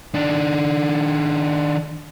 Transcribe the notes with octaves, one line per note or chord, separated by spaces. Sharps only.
D#3 D4